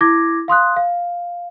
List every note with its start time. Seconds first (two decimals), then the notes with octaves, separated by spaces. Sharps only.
0.01 E4 D6 G#6 A#6
0.48 F5 C6 D#6 F#6
0.76 F5